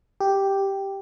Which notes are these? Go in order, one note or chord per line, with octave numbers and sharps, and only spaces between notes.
G4